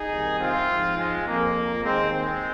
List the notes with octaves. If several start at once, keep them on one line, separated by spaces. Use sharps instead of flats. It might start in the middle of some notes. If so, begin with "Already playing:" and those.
Already playing: D#4 G#4
C2 C3 D#3
C4 F4
G#2 F3
G#3
F2 F3 A#3
D#2 D#3 G#3 C4
G#3 C4